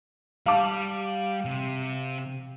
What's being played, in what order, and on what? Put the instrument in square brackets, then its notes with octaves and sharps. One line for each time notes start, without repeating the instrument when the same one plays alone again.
[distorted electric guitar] G3 [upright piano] F5 A5 D6
[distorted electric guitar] C3